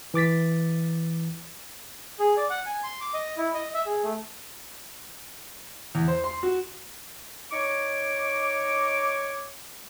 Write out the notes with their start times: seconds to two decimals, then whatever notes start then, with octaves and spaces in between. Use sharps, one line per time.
0.14 E3 D6 A6 B6
2.19 G#4
2.37 D5
2.50 F#5
2.66 G#5
2.83 C6
3.01 D6
3.14 D#5
3.37 E4
3.54 D#5
3.74 E5
3.86 G#4
4.04 A3
5.95 E2
6.08 C5
6.24 C6
6.43 F#4
7.52 D#4 C#5 C#6 D6